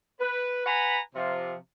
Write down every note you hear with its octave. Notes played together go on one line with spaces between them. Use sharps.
B4
B4 F#5 G#5 A#5 B5
C3 F3 F4